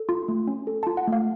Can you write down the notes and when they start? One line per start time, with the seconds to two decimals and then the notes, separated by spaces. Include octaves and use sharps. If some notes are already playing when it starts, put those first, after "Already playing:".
Already playing: A4
0.09 F4 C6
0.28 A3
0.48 C#4
0.67 A4
0.83 F4 A5
0.97 F#5
1.08 A3 F5